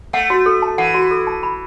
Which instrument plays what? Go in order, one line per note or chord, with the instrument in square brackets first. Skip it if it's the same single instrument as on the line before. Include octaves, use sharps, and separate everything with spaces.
[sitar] A3 [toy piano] F#5
[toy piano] F#4
A4
A5
[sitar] E3 [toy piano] F#5
[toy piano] F#4
A4
A5
B5